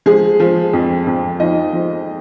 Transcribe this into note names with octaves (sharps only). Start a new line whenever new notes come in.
F3 G#3 G#4
F3
F2
F2
F3 D#4 D#5
F3